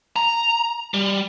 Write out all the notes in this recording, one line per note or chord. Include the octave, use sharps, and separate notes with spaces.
A#5
G3